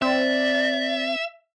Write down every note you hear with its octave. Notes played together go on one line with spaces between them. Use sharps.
C4 D5 E5